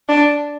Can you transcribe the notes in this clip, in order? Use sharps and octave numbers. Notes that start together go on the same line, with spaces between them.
D4